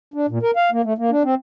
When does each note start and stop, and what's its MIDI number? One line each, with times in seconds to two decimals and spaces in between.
0.14 0.26 62
0.29 0.39 46
0.43 0.51 70
0.56 0.70 77
0.72 0.82 58
0.84 0.93 57
0.98 1.10 58
1.11 1.23 62
1.24 1.35 60